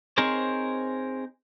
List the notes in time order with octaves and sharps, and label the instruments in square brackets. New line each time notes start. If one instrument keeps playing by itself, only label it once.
[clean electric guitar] C4 D#4 G#4 A#4 C5 C#5